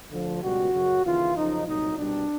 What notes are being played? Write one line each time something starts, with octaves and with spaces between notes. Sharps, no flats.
D2 D3 F3
C#2 B2 G3 F#4
F#2 C#3 F#3
D#2 C#3 E3 F4
F#2 C#3 F3 D#4
C2 A#2 F#3 D#4
C2 B2 G3 D4